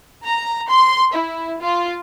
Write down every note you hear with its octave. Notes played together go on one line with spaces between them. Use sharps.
A#5
C6
E4
F4